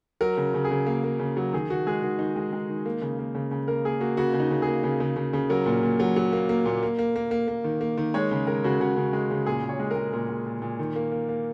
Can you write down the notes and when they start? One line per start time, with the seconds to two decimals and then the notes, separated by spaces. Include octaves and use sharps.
0.21 F#3 A#4
0.37 C#3
0.54 C#3
0.65 G#4
0.71 C#3
0.86 A#3
1.04 A#3
1.20 C#3
1.37 F#3
1.53 D#3 G#4
1.69 D#3 F#4
1.87 G#3 G#4
2.02 D#3 F#4
2.19 D#3 D#4
2.36 G#3
2.53 G#3
2.69 D#3
2.86 A#3
3.02 C#3
3.19 A#3
3.35 C#3
3.51 C#3
3.68 A#3 A#4
3.85 A#3 G#4
4.01 A#3 F#4
4.17 C#3 F#4
4.34 C#3
4.40 D#4
4.51 C#3
4.62 A#3 G#4
4.83 C#3
5.00 C#3
5.16 C#3
5.33 C#3
5.50 F#3 A#4
5.66 A#2
5.83 A#2
6.00 F#3
6.16 F#3
6.32 A#3
6.49 A#3
6.65 A#2
6.83 A#3
6.99 A#3
7.16 A#3
7.31 A#3
7.48 A#3
7.64 D#3
7.81 A#3
7.97 D#3
8.14 G#3 C#5
8.31 C#3
8.47 G#3 A#4
8.64 C#3 F#4
8.80 C#3 F#4
8.97 C#3
9.13 G#3
9.31 C#3
9.46 A#2 G#4
9.63 A#2
9.69 C#5
9.80 G#3
9.91 G#3 A#4
10.13 A#2 A#4
10.29 G#3
10.46 A#2
10.62 A#2
10.79 D#3
10.96 A#3
11.12 A#3
11.29 A#3